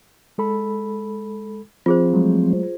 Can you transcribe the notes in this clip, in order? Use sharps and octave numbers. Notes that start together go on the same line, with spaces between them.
G#3 A4 B5
F3 C4 F4 G#4 C5
F#3 G#3 A3